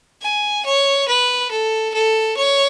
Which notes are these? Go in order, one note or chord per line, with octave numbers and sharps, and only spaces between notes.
G#5
C#5
B4
A4
A4
C#5